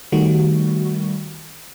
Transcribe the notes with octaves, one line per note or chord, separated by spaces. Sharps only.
D#3 G3 A3 F#4